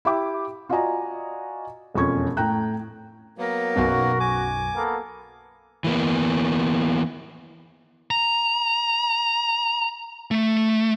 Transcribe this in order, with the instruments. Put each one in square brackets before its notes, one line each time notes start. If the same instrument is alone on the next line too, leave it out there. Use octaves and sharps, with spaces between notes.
[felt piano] E4 G4 E5 G5 D6
F4 F#4 D5 D#5 G#5 A#5
E1 F2 C#4 C#6 G#6
A2 G5 A#5 F#6
[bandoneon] F#3 A#3 B3 [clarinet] A#4
[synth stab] B1 F#2 B2 [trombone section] F#4
[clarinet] G#5 [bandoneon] D6
[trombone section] A#3 B3 A4
[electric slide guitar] E3 A#3 B3
[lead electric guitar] A#5
A3